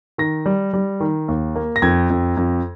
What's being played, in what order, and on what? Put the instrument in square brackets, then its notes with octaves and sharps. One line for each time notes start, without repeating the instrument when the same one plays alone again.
[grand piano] D#3 A#6
G3
G3
D#3
D#2
A#3
A#6
F2 G#6
F2
F2